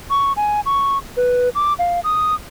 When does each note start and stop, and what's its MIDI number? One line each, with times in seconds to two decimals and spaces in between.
0.10 0.33 85
0.36 0.60 80
0.66 0.98 85
1.17 1.49 71
1.55 1.73 86
1.79 2.00 77
2.04 2.34 87